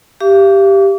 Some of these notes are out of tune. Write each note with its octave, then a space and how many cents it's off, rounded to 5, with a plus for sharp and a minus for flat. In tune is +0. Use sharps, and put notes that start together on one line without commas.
G4 +0 F5 -40 D6 -40